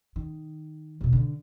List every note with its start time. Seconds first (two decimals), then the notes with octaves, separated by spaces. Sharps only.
0.16 D#3
1.01 E1 B2
1.13 D3